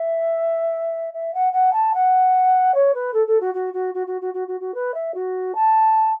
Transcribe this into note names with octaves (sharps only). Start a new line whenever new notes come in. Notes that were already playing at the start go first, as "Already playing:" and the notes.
Already playing: E5
E5
F#5
F#5
A5
F#5
C#5
B4
A4
A4
F#4
F#4
F#4
F#4
F#4
F#4
F#4
F#4
F#4
B4
E5
F#4
A5